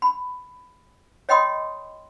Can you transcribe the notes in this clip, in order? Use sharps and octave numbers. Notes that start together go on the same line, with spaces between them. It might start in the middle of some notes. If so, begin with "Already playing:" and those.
B5
C#5 D#5 G5 B5 C6 D#6